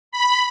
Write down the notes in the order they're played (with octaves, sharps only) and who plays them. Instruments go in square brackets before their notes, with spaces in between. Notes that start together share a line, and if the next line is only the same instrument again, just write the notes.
[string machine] B5